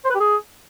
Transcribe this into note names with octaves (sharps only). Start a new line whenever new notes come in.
C5
B4
G4
G#4